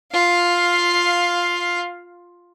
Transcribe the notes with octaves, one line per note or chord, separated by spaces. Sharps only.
F4 F5